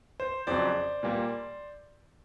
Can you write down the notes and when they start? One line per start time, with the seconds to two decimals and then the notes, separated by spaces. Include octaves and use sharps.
0.20 C5
0.47 F2 C#3 F#3 C5 D5
1.03 A#2 G3 A#3